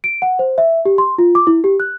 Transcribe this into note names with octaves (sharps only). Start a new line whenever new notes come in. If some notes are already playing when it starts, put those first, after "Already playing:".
D7
F#5
C5
E5
G4
C6
F4
D6
E4
G4
F#6